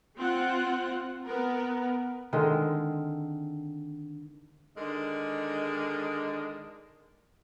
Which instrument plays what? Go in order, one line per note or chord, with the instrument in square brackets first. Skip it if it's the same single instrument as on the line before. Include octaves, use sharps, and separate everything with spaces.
[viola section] C4 F4 F#5
B3 A#4
[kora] D3 D#3 G#3 C4
[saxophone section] D3 D#3 G#3